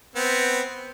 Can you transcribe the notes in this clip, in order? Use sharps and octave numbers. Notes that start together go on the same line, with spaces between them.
B3 C4